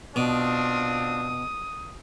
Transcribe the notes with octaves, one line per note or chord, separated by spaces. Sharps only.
B2 C4 D4 F4 D#6